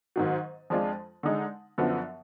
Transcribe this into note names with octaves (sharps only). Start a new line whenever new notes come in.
G#2 D#3 F#3
F2 F3 G#3 D4 F4
D3 G#3 D#4
F#2 D3 F3 B3